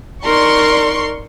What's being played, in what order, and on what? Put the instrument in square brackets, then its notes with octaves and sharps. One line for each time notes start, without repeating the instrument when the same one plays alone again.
[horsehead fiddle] D#4 A#4 [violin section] D5 C6 C#6